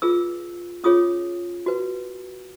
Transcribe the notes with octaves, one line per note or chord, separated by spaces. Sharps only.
F4 G#4 B4 E6
C#4 F4 G#4 C#5 D#6
F#4 B4